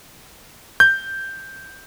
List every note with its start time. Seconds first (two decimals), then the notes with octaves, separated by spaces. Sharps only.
0.80 G6